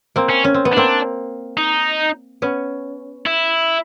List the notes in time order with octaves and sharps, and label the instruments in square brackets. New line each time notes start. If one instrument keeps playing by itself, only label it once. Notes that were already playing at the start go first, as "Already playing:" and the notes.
[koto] A#3 C4
[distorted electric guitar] C#4
[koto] C#4
C4
B3
[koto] A#3 C4 [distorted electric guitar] D4
[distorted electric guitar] D#4
[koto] B3 C#4
[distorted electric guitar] E4